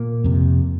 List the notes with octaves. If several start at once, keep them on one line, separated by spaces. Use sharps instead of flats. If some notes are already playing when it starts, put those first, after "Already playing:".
Already playing: A#2 A#3
F2 C3